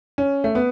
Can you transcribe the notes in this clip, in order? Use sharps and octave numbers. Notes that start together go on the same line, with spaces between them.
C#4
A3
B3